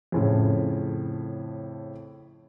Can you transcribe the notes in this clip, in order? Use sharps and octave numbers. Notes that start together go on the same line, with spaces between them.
F2 A2 C#3